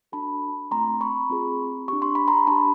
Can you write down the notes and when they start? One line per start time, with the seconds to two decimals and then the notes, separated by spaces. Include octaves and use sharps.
0.12 D4 F#4 A4 A5 B5
0.71 A3 C4 F4 A#5 C6
1.01 B5 C#6
1.30 C4 F4 G#4
1.88 D4 G4 C#6
2.02 C6
2.15 B5
2.28 A#5 C6
2.47 D4 G4 A5 B5